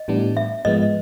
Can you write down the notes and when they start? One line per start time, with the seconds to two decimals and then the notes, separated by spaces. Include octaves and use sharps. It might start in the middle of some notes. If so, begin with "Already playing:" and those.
Already playing: D#5
0.08 A2 E3 G3 B3 D4
0.37 E5
0.65 G#2 F3 G#3 B3 D#5